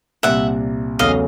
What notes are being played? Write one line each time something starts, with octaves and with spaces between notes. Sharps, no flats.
C2 A#2 G3 C4 E5 F#5
E2 C#3 F#3 A3 D#5 F5